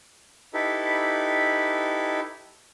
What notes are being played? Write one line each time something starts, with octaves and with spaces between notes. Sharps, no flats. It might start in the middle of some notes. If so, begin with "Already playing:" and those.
D#4 E4 G4 A4 B4